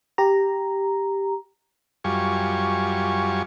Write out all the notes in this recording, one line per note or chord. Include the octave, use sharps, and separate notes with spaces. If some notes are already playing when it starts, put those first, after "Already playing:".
G4 A#5
F#2 G3 F4 G#5 C#6